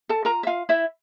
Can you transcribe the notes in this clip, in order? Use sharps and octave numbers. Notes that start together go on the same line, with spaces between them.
A4 A5
F4 A#4 A#5
E5
F4 F5
E4 E5